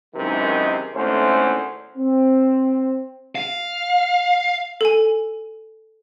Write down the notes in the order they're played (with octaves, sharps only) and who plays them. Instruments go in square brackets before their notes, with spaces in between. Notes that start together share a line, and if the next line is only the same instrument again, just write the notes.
[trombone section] F#2 C3 D#3 E3 G#3 D#4
G#1 E2 A3 C#4 C5
[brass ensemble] C4
[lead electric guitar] F5
[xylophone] A4 G#5